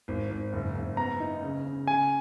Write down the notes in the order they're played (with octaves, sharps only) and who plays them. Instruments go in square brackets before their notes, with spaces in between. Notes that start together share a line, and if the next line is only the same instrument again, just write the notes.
[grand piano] G#1
G#1
F#1
F#1
[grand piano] B3 [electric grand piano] A#5
[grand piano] D#4
C#3
C#3
[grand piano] C#3 [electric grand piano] G#5